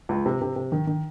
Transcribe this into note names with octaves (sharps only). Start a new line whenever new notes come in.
C#2
C3
C3
C3
D#3
D#3